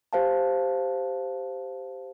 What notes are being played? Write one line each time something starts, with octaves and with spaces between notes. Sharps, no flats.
G4 C5 F5 A5